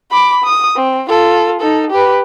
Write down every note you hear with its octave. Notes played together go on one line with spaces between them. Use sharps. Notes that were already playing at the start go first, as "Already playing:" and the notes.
B5 D6
D#6
C4
F4 A4
D#4 A4
G4 B4